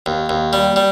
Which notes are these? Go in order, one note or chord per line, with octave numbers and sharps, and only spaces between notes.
D#2
D#2
G3
G3